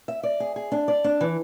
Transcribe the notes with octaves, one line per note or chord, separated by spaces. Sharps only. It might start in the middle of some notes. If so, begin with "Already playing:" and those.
E5
D5
G#4
G#4
D4
D5
D4
E3